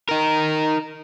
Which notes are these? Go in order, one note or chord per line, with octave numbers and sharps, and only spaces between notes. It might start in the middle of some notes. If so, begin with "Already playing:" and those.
D#4 A#4